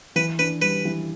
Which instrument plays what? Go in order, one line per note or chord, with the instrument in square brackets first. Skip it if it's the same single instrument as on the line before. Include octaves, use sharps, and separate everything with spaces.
[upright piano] E3 [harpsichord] B4
[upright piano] D4 [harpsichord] B4
[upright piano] G3 [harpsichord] B4
[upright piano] E3